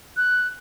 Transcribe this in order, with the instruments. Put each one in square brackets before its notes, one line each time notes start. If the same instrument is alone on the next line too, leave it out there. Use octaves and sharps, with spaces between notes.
[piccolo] F#6